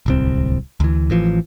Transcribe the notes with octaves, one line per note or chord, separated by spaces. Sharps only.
D1 C2 C4
D2 E3
A1 E3 F3